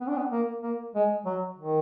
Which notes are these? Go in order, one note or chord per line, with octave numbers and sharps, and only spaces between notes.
B3
D4
B3
A#3
A#3
G#3
F#3
D#3